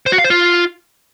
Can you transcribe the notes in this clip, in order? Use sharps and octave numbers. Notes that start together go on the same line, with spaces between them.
C5
F#4
F5
C5
F4